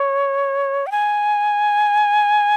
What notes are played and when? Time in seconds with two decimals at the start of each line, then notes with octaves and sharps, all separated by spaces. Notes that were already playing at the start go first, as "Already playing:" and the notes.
Already playing: C#5
0.87 G5
0.92 G#5